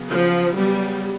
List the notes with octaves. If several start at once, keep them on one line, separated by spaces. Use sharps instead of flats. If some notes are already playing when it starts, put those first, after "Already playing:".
Already playing: C#3 F#3 B3
C#3 F3
F#3 G3 B3